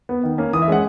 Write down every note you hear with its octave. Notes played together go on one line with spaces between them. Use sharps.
B3
D#3
A#3 C#4
E3 D#6
E5
G#3 C#4 F#5